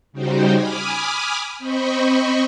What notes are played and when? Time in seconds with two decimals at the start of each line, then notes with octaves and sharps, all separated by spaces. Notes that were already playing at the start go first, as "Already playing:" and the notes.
0.12 C#3 G3 D#4 F#4 G4 C5
0.54 G#5 B5 D6 D#6 F6
1.59 C4 C5 D#5 B5 C#6